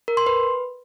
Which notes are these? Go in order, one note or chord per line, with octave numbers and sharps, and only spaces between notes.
A#4
C6
B4